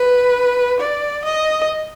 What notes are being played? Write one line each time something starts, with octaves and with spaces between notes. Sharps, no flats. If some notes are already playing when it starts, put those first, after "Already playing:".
Already playing: B4
D5
D#5